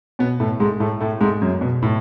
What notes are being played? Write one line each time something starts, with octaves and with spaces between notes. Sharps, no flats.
B2 B3
A2 A3
G#2 G#3
A2 A3
A2 A3
G#2 G#3
F#2 F#3
B2
A2